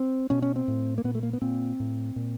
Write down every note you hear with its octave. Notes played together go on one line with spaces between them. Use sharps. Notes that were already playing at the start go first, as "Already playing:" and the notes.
Already playing: C4
B2 C#4
C#4
C4
A2
A#3
A#2 B3
A3
A#3
B3
A#2 C4
A2
A#2